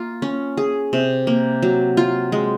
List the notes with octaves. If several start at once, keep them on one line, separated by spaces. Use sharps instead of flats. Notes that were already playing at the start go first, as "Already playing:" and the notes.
Already playing: A#3 F4
C#4
G#4
C3
A#3
F#3
F4
G#3